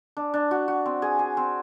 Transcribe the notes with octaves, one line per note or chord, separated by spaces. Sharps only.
D4
D4
F#4
F#4
C4
G#4
G#4
C4